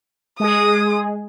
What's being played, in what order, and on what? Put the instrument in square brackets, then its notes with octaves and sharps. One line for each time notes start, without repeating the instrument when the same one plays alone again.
[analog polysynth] G#3 G#4 [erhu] D#6